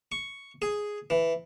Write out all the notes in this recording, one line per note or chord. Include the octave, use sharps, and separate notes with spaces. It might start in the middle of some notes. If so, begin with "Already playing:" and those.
C#6
G#4
E3